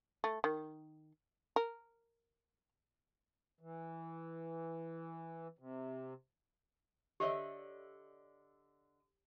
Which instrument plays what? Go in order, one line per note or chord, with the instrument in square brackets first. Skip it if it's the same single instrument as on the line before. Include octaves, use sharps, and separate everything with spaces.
[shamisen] A3
D#3
A#4
[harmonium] E3
C3
[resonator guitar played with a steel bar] D3 D#5 E5 [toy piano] G4 C#5